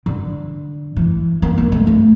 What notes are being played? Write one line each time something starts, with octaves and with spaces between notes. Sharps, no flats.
D3
E3
A#3
A#3
A3
A3